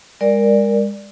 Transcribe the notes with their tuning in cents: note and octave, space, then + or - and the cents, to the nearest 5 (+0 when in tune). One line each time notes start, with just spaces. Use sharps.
G#3 -30 A#4 +0 D5 +0